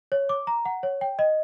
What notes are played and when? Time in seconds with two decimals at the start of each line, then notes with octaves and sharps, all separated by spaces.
0.12 C#5
0.29 D6
0.47 A#5
0.65 F#5
0.83 C#5
1.01 G5
1.19 D#5